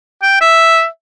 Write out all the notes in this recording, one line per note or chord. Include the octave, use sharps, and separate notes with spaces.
G5
E5